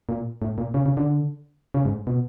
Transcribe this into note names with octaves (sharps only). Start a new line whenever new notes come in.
A#2
A2
A#2
C#3
C#3
D3
C#3
G#2
B2